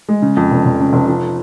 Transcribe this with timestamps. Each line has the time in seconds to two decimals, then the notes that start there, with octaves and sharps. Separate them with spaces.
0.09 G#3
0.22 C#3
0.37 F2
0.51 F1
0.65 F1
0.80 C#3
0.93 F1
1.08 F3